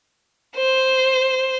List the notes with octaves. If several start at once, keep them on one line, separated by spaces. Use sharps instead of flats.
C5